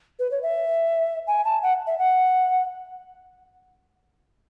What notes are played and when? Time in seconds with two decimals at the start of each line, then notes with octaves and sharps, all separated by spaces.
0.19 B4
0.31 C#5
0.42 E5
1.27 G#5
1.45 A5
1.62 F#5
1.87 E5
1.99 F#5